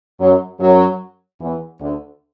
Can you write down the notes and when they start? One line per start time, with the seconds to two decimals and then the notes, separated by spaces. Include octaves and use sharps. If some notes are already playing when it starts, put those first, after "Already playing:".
0.20 F#2 F#3
0.60 F#2 F#3
1.40 E2 E3
1.81 D2 D3